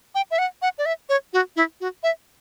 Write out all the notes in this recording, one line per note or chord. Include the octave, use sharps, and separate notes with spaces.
G5
E5
F#5
F#5
D5
E5
C#5
F#4
E4
F#4
E5